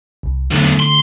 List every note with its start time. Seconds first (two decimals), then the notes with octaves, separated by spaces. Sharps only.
0.23 C2
0.51 B1 E2 D3 A3
0.80 C6